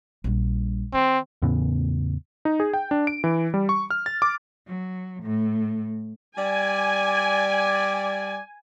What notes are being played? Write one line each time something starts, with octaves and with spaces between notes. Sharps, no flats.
A#1 G3
D#3 C4
E2 A2 C#3 B3
D#4
G#4
G5
D4
D7
E3
G3
C#6
F6
A6
D6
F#3
A2
G3 D5 G#5